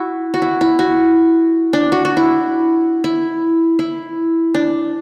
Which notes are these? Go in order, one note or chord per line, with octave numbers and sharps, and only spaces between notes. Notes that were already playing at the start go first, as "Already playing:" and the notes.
Already playing: E4 F#4
F#4
E4
E4
F#4
D4
F#4
F#4
E4
E4
E4
D4